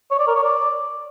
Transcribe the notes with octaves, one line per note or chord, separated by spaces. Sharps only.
C#5
D5
A#4
C#5
D5